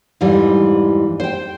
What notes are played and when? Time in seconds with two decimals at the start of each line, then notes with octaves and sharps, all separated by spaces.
0.21 F2 G#2 E3 G3
1.20 C5 G5